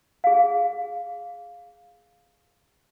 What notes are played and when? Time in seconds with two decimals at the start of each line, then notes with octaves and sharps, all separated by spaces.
0.24 G#4 F5